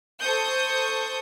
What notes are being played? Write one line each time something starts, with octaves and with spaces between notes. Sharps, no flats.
A4 C5 C#6 D#6 G6